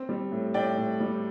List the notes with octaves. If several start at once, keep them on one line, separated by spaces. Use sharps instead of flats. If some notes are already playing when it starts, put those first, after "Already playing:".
Already playing: C4
G3
A2
A2 D5 G5
A2
G3